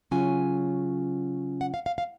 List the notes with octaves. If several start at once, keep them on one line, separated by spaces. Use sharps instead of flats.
C#3 F#3 C#4 F4 G#5
F#5
F5
F5
F5